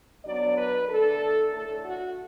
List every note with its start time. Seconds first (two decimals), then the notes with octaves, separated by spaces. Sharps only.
0.25 B2 F#3 B3 D4 D5
0.57 B4
0.89 D3 A3 D4 A4
1.52 A2 A3 D4 A4
1.84 F#4